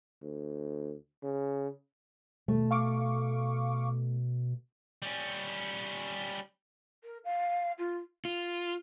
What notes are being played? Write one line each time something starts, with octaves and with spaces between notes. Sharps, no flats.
D2
C#3
D#2 B2 A3
F5 C#6 D6
G3 C#4
A#4
F5
F4
F4